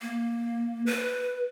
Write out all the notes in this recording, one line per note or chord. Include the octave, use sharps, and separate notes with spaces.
A#3
B4